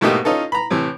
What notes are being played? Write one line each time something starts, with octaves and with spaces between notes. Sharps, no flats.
G#2 B2 A3 A#3 D#4 G4
C#4 D#4 F4 A4
A#5 B5
A2 C3 E3